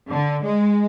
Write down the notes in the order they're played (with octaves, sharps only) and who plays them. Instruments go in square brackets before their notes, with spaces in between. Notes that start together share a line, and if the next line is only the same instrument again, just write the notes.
[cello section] D3
G#3